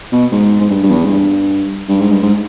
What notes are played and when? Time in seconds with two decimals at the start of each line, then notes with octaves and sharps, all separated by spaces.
0.12 B2
0.32 G#2
0.61 G#2
0.70 G2
0.83 G2
0.90 E2
1.05 G#2
1.09 G2
1.88 G2
2.00 G#2
2.12 G2
2.22 G#2